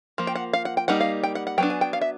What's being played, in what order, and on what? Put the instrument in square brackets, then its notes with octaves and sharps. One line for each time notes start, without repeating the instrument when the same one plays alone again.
[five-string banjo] F3 A#3
G5
F#5
F5
F#5
G5
G3 A#3 D#4 F#5
F5
G5
F#5
F#5
F#3 B3 D4 G5
G#5
G5
F5
E5